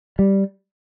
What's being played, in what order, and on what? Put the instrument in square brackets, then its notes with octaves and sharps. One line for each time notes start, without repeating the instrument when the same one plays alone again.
[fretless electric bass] G3